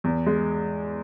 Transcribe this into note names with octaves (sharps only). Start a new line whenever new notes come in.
E2
G#3